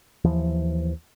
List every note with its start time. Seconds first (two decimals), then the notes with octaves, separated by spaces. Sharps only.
0.24 D#2 E3 F3